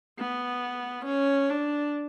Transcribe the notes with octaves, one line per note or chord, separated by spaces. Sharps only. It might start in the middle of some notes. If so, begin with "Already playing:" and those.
B3
C#4
D4